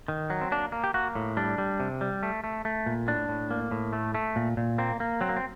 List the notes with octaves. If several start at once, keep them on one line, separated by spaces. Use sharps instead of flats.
D#3
F#3
C4
A#3 D4
A#3
G4
A#3 F#4
A2
G3 D4
G3
C3
G3
A3
A3
A3
A#2
A2 D4
A2
A#3
A2
A3
A3
A#2
A#2
A#3 C4
A#3
F#3 C4
A#3
C4